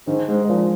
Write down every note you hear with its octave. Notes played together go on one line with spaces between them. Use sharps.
G#2 D#3
G#2 G#3
G#2
A#2 F3